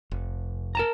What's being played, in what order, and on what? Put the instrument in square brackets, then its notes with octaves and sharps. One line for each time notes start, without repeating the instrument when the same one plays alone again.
[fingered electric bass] F1
[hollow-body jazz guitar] A#4 A5 A#5